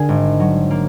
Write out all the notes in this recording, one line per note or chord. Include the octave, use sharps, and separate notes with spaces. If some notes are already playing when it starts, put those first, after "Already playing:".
Already playing: D3 G#4 A#4 G#5
G#1
F#3
A#3